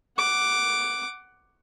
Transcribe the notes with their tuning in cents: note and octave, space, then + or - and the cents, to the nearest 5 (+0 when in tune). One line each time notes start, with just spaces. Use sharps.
F#5 +15 D6 +0